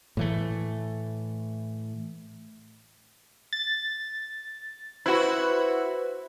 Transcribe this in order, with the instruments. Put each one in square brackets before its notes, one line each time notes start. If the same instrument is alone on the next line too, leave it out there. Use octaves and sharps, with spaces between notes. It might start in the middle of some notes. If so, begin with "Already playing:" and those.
[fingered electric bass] A2 E3 A3
[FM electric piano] A6
[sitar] E4 F#4 [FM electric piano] B4 C5